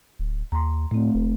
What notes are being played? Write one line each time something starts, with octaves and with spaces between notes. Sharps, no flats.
D1
D#2 A#5 C6
A2 A3 C4
E1